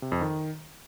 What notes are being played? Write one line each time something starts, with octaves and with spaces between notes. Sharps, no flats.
C3
F2
D#3